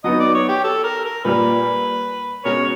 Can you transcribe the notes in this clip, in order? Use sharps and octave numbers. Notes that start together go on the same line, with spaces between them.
F#3 B3 D#4 D#5
D5
C#5
G4
A4
A#4
A#4
A#2 G3 A#3 B4
B2 G#3 C#4 A#4 C#5